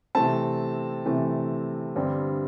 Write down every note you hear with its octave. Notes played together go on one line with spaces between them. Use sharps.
C3 E3 A3 C4 A5
C3 E3 A3 C4
G2 D3 G3 C4